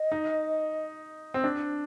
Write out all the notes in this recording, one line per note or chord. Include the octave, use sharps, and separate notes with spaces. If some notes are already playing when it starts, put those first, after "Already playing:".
Already playing: D#5
D#4
C4
D4